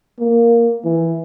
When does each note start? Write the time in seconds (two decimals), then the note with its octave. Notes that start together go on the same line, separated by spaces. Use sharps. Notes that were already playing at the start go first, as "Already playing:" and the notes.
0.19 A#3
0.85 E3